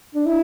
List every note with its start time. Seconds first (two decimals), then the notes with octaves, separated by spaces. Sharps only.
0.15 D4
0.26 E4